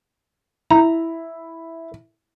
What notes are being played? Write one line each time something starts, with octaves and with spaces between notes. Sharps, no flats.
E4 A#5